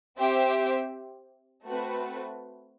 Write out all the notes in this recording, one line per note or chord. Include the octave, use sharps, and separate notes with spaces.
C4 G4 C5 E5 G5
A3 C4 F#4 B4